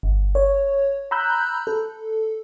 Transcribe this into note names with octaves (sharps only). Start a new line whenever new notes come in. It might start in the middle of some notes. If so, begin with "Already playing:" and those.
G1
C#5
A#5 B5 E6 F#6 G6
A4